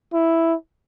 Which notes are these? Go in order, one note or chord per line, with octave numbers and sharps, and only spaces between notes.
E4